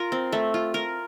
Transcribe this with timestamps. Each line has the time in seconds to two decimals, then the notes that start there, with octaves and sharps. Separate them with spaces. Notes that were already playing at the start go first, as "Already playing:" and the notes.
Already playing: F4 A#4
0.12 C4
0.32 A3
0.54 F4
0.74 A#4